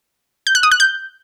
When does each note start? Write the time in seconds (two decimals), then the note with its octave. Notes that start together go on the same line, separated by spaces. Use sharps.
0.47 G6
0.55 F#6
0.63 D#6
0.71 F#6
0.80 G6